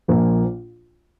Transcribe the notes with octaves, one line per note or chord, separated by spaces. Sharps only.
A#1 A#2 F3 A#3